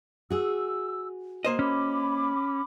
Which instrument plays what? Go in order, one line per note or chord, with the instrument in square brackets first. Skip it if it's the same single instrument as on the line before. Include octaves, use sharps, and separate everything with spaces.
[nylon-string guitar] F#4 G#4 [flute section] E6
[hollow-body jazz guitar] A#3 C5 D#5 [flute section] C6
[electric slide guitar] C#4 [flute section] B5 D6